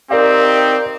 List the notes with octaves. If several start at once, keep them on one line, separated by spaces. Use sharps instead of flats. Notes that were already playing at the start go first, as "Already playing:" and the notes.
C4 D#4 G4 A#4 D5 F5